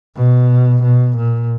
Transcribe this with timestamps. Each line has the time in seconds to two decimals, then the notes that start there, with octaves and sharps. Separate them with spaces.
0.16 B2
0.83 B2
1.17 A#2